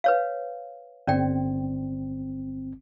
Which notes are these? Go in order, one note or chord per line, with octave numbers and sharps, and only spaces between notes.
B4 C#5 F5
G1 C4 C#4 D5 G5